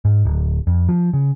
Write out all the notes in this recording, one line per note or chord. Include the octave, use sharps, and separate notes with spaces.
G#2
D1
F2
F3
C#3